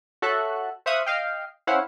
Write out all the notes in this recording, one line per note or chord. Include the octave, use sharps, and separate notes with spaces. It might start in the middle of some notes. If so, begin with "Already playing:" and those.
F#4 A4 C#5 E5 F#6
C5 E5 F5 C#6 D#6 F#6
D#5 F5 G5
C#4 E4 C5 F5 F#5